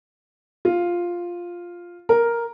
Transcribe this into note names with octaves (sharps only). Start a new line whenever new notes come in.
F4
A#4